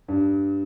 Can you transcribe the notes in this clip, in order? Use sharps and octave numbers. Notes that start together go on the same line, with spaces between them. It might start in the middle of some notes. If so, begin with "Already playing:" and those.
G2